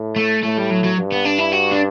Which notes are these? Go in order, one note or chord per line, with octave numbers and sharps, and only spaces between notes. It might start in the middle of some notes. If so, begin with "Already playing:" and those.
Already playing: A2
A3
A2 A3
G3
F#3
F#3
G2
B3
D4
E4
F#4
D4